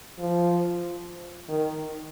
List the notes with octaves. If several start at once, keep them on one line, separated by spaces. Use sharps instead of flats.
F3
D#3